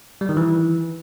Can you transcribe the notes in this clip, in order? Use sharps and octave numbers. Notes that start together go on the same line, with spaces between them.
G3
D#3
E3